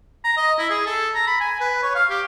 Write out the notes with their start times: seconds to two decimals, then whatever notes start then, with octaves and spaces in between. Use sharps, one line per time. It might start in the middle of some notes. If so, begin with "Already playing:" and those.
0.24 A#5
0.37 D#5
0.59 E4
0.70 G#4
0.86 A4
1.14 A#5
1.27 B5
1.40 G#5
1.61 B4
1.83 C#5
1.95 F5
2.10 G4